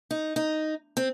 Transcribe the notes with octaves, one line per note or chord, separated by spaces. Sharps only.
D#4
D#4
C4